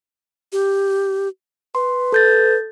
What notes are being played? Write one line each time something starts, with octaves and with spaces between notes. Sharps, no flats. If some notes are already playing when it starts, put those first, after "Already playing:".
G4
B4 C6
A4 G6 A6